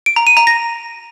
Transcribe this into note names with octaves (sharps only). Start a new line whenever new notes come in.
D7
A#5
D#7
A#5
A#6